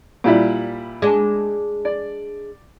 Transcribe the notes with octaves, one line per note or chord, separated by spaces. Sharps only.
A#2 G3 E4
G#3 D4
D5